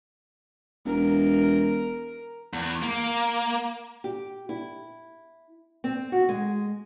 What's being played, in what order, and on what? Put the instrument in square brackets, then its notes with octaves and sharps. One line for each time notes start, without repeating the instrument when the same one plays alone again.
[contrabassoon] E1 [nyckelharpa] A#4
[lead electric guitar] E2
A#3
[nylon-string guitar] G4
E4
C4
F#4
G#3